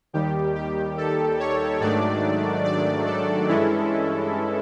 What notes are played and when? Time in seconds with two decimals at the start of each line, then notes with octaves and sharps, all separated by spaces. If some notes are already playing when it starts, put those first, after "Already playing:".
0.13 D#2 D#3 G3 G4
0.55 G4
0.98 A4
1.40 C#5
1.81 G#2 D#3 F#3 A3 D4 D5
2.64 D5
3.06 A4
3.48 G2 E3 G#3 C#4 E4